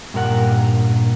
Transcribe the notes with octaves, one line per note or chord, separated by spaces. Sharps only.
G2 A#2 A#4 F#5